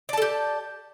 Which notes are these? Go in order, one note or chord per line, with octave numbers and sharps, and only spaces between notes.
G4 A4 D5 A5